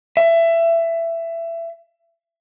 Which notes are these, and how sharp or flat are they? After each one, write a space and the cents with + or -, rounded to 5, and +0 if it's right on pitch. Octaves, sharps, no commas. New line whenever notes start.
E5 +20